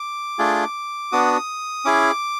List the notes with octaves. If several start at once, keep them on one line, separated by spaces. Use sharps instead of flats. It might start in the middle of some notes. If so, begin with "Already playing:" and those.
Already playing: D6
A3 D4 F4 G#4
B3 D4 F#4 D#6
C#4 E4 G#4 D6